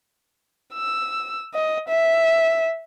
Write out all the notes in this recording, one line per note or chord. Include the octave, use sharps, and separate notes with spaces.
E6
D#5
E5